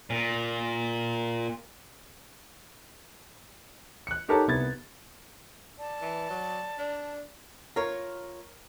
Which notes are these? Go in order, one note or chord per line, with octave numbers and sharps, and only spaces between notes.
A#2
F#6 C#7
D#4 G4 A4 A#4 C#5 A5
C2 B3 G#6 A6
D5 A5
E3
F#3
D4
F4 A#4 C#5